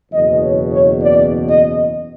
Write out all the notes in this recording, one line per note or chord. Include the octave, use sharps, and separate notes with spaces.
F#1 E2 B2 D#5
C#5
C#5
D5
D#5